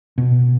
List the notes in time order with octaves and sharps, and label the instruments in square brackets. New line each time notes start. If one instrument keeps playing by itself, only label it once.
[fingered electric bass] B2